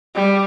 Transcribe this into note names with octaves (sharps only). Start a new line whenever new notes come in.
G3